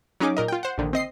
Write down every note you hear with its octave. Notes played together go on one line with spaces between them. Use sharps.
F#3 C#4 D#4 G#4 D6
A#2 A#4 D#5
F4 G5
C5 F#5
A#1 D3 D#3
C4 D#5 C7